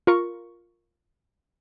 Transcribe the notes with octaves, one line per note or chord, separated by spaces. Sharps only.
F4 A#4 C#6